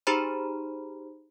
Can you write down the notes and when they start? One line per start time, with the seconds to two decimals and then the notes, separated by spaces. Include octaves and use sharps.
0.07 D#4 G4 G#4 C5 A#5 B5